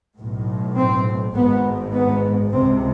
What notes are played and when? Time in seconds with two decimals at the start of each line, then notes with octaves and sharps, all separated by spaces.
0.17 B1 A2
0.77 C4
1.35 G#1 G#2 B3
1.95 B3
2.53 C#2 C3 C4